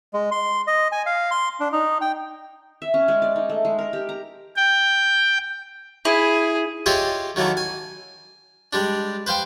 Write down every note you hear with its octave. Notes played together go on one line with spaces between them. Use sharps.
G#3
C6
D#5
G#5
F5
C6
D4
D#4
G5
E5
C#4
G#3
D5
D#4
A3
G#3
A#4
G4
A#5
G5
E4 G#4
F4 G4 G#4 C#5 D#5 E5
D#3 F#3 A3 A#3 E4
G#5
G3 G#3 D4
B4 C5 F5 G5